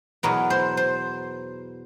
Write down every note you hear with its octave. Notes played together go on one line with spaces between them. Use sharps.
E2 B2 F#3 B3 A#4
C5
C5